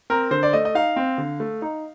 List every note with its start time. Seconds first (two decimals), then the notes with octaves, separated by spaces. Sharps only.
0.10 C4 A#4
0.31 D3 C5
0.43 D5
0.53 A3 D#5
0.65 D#5
0.75 D#4 F5
0.96 C4
1.18 D3
1.40 A3
1.62 D#4